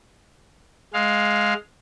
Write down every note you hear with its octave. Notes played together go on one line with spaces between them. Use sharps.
G#3 F5